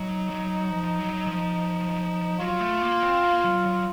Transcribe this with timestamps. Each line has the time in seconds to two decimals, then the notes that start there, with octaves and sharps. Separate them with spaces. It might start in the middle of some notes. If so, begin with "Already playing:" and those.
Already playing: F#3 D#4
0.30 F#3
0.71 F3
0.99 F#3
1.27 F3
2.39 F#3 F4
2.60 A3
2.82 A#3
3.03 C4
3.24 A#3
3.44 F#3
3.66 F#3